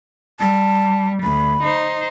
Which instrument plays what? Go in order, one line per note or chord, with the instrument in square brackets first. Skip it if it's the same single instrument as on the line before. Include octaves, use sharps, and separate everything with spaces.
[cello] G3 [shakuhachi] A5
[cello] D2 [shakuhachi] B5
[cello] D#4 C5